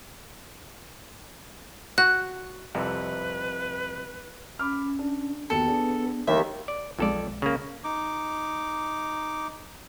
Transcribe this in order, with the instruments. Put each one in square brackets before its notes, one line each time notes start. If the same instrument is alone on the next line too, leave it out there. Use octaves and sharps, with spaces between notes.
[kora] F#4 [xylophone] F#6
[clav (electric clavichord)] C2 F2 C3 [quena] B4
[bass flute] C#4 [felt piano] B5 D6 F6
[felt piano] D4
[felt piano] D#2 F#4 C#7 [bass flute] B3 [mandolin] A4
[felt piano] D4 G#4
[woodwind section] D#2 [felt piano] E3 G3 A3 [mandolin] E5
[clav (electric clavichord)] D5
[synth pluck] B1 G#3 [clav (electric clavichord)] F2 A4 D5
[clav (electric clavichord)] C#3 A#3
[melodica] D#4 D6